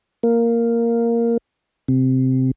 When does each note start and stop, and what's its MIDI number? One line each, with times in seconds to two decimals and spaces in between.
0.23 1.37 58
1.88 2.51 48